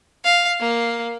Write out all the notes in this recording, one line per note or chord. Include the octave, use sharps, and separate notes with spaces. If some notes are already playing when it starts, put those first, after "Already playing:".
F5
A#3